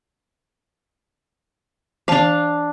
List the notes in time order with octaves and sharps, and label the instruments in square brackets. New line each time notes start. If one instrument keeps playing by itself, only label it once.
[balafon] E3 A5 [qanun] D4 F5